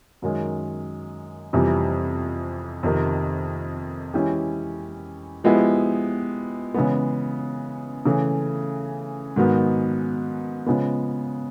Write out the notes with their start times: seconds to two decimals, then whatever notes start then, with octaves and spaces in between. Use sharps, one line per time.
0.22 F#2 D#3 G#3
1.53 F2 C3 E3 G3
2.83 F2 C3 D#3
4.14 E3 G#3 C#4 E4 G4
5.44 F3 G#3 B3 E4 G4
6.74 C#3 E3 G#3 B3
8.05 C#3 E3 A3
9.36 G#2 D#3 F#3 B3
10.66 C#3 F3 G#3 B3